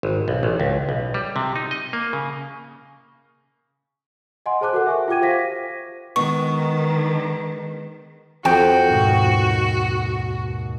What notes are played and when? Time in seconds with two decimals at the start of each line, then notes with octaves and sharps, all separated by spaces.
0.03 G#1
0.28 B1
0.43 A1
0.60 C#2
0.89 B1
1.14 G3
1.36 C3
1.56 D#4
1.71 D#5
1.93 A#3
2.13 C#3
4.46 D#5 F#5 G#5 C6
4.61 G#4 C5 A5 D6 F#6
4.73 F#4 A4 A#4 F#5
4.86 E5 G#5 C#6
5.08 F4 G4 G5 D6 G#6 D#7
5.22 C5 F5 A#6 B6
6.16 D#3 G#3 B3 C#6
8.45 F2 F#4 G5
8.88 D#2 G#2 B2